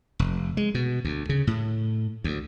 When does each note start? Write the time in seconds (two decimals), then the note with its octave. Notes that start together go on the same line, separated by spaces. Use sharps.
0.19 F1
0.57 G#3
0.75 B2
1.05 D2
1.29 C#3
1.47 A2
2.24 D2